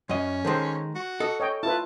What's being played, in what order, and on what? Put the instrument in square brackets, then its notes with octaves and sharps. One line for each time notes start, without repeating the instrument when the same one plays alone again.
[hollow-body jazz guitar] F#2 D#5 [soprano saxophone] C#4
[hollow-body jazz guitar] D#3 G#3 [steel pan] A4 C5
[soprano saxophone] F#4
[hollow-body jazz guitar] A4 [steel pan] D#5
[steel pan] C#5 D#5 G5
[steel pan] E4 F4 B4 [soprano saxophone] A5